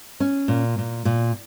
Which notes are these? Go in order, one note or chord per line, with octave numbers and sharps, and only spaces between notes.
C#4
A#2
A#2
A#2